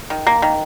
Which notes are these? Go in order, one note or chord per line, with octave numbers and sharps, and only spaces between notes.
D#3
A#3
D#3